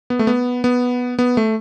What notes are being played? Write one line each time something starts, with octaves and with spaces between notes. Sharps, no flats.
B3
A3
B3
B3
B3
A3